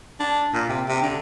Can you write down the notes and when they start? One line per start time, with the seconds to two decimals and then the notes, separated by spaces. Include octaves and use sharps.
0.20 D4
0.54 A#2
0.69 C3
0.88 C3
1.02 D3